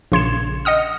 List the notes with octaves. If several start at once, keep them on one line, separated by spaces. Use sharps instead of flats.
A#1 C#3 C6 G#6 C#7 E7
D#5 F#5 D#6 F6